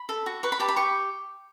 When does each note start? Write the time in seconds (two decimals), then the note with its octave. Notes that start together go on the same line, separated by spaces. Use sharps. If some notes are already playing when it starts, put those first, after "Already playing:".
Already playing: B5
0.09 A4
0.26 F#4
0.43 B4 C#6
0.52 B5
0.60 G4 A5
0.68 B5
0.76 G4 C#6